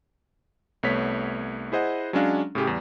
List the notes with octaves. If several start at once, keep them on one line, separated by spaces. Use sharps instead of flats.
C2 A3 B3 C#5 B6
E4 G#4 C5 D#5 F#5
F#3 G#3 C#4 D4 F5
A2 C#3 G4 G#4
E2 G3